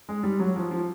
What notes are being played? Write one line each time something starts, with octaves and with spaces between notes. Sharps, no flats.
G#3
G3
F#3
F3
F3